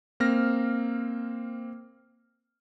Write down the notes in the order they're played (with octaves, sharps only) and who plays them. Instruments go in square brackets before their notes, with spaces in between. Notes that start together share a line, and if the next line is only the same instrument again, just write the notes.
[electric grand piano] A#3 C4 F6 A#6